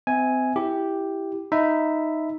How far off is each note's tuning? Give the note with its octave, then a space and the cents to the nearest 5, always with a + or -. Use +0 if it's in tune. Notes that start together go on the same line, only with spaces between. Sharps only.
C4 -35 E5 -30 G#5 +0
E4 +0 G4 +0
D#4 +0 E5 +0 B5 +20